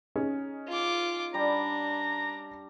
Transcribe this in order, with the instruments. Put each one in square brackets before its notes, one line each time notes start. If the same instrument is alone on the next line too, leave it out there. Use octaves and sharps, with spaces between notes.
[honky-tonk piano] C#4 D#4 G#4
[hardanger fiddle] F4 D6
[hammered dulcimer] G3 [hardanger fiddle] D4 [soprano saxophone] A#5